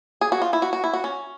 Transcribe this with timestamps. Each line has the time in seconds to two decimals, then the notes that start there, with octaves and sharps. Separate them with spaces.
0.21 G#4
0.32 F#4
0.42 F4
0.53 E4
0.62 F#4
0.73 F#4
0.84 E4
0.93 F#4
1.04 C#4